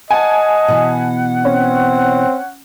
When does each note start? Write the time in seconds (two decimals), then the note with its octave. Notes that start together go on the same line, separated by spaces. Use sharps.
0.11 D#5 F#5 G#5 A5
0.68 B2 E3
1.45 C4 C#4